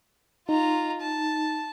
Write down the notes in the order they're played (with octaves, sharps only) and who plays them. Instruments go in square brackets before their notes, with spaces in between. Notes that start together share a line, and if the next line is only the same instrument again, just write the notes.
[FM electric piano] D#4 [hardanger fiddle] F4 A#5
[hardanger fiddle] A5